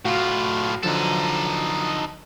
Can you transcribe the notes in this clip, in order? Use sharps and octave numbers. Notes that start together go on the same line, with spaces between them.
A2 F4 F#4 F5
D3 F3 F#3 D#4 A4